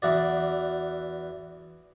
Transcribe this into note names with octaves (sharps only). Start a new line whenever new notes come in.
E2 E3 F#4 D5